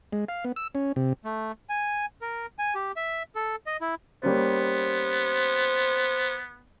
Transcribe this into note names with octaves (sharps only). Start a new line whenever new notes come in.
G#3
F5
B3
E6
C#4
C3
A3
G#5
A#4
G#5
G4
E5
A4
D#5
E4
G3 A#3 B3 C#4 C5